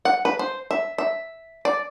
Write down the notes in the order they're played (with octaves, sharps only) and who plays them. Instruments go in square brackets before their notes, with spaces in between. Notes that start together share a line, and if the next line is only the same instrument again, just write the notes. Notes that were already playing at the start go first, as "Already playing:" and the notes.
[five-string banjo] F#5
B4
C5
E5
E5
D5